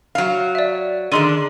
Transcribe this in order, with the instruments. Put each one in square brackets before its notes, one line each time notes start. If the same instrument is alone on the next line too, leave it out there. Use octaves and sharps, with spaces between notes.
[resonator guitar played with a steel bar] F#3 F5
[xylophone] D5 E5
[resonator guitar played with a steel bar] D3 D#3 D4 [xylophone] G#4 C6 D#7